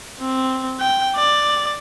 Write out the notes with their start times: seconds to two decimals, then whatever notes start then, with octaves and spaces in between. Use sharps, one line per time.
0.20 C4
0.80 G5
1.16 D5